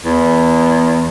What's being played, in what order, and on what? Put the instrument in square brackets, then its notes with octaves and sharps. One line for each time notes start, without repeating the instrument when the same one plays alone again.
[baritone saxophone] E2